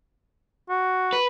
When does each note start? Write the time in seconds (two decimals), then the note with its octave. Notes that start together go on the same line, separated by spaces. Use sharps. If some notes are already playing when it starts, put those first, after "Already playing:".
0.69 F#4
1.13 B4